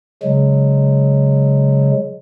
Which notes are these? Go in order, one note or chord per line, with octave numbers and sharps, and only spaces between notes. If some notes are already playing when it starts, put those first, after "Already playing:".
C#3 F#3 G#3